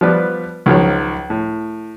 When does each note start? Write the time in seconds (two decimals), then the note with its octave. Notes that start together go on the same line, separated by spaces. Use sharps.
0.01 F3 G3 B3 B4 D5
0.66 C#2 D#3 F3 F#3 C#5
1.30 A2